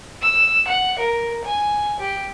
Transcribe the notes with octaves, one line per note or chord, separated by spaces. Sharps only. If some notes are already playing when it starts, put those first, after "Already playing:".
E6
F#5
A#4
G#5
G4